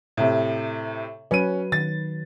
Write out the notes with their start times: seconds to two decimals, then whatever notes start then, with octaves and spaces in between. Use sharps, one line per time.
0.17 A2 C3
1.31 F#3 C#4 B4 D#7
1.72 D#3 A6